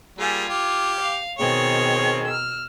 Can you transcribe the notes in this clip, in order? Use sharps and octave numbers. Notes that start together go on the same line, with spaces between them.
G3 A#3 F4 G#4 G#5 G#6
G4 D6 F6
F5
B2 D#3 C4 G#4 C#5 G5
E6 F6